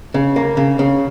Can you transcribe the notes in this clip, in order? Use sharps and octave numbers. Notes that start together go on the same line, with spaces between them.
C#3
A#3
C#3
C#3